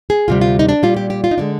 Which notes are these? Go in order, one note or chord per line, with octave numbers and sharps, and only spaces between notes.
G#4
D2 C3 G3 F4
F4
D#4
D4
A#2 G3 F4
G4
G4
F4
D#4
D3 G#3 D4